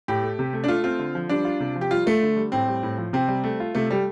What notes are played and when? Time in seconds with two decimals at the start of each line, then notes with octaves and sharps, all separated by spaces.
0.08 A2 G4
0.22 A3
0.39 C3
0.53 A3
0.64 D4
0.68 A3 F4
0.84 C4 F4
0.99 D3
1.15 F3
1.29 G3 D4
1.45 F4
1.60 C3
1.76 F3
1.81 G4
1.91 G3 F4
2.06 A3 F4
2.22 D3
2.37 G3
2.52 A2 C4
2.68 G3
2.83 A2
2.98 F3
3.13 C3 C4
3.28 G3
3.44 A3
3.60 F4
3.75 C3 A3
3.91 G3 A3